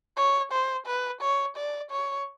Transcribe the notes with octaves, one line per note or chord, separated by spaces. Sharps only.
C#5
C5
B4
C#5
D5
C#5